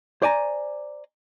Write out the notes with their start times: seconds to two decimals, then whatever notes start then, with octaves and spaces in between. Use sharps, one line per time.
0.22 C5 D5 G#5 A#5